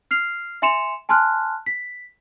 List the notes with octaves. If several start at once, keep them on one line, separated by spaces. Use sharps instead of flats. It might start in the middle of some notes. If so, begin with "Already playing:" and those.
F6 C7 F7
E5 G#5 C6 C#7 E7 F7
G#5 A5 C6 F6 F#6
B6